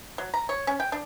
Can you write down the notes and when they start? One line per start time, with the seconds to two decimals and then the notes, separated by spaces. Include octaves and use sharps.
0.18 F#3
0.34 A#5
0.49 C#5
0.67 C#4
0.80 G5
0.92 D4